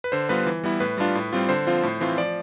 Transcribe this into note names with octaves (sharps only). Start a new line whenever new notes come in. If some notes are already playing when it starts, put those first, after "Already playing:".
B4
D3 C5
G3 B3 F4 B4
E3
G3 B3 E4
A2 B4
G3 D4 F4
A2
G3 C4 F4
D3 C5
F3 C4 F4
A2
E3 A3 C4 F4
F3 D5